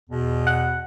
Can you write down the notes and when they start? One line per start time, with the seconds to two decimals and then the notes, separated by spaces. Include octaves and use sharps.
0.10 E2 B2
0.47 F#5